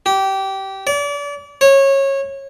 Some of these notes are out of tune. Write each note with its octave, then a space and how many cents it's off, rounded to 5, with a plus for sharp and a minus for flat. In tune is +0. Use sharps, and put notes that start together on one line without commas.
G4 -20
D5 -35
C#5 -20